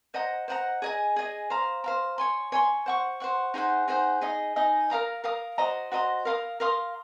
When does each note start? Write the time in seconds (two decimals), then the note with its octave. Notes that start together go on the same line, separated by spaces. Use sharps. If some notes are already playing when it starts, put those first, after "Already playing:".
0.14 C5 D#5 F#5 A#5
0.48 C5 D#5 F#5 A#5
0.82 G#4 D#5 G#5
1.16 G#4 D#5 G#5
1.50 C5 F5 A#5
1.84 C5 F5 A#5
2.18 C#5 G#5 C6
2.52 C#5 G#5 C6
2.86 C5 F#5 C#6
3.20 C5 F#5 C#6
3.54 D#4 G#4 C5 F#5
3.88 D#4 G#4 C5 F#5
4.21 D#4 G#4 D#5
4.56 D#4 G#4 D#5
4.90 A#4 F5 A#5 D#6
5.24 A#4 F5 A#5 D#6
5.58 F#4 C5 D#5 A#5
5.92 F#4 C5 D#5 A#5
6.25 A#4 F5 C6 D#6
6.60 A#4 F5 C6 D#6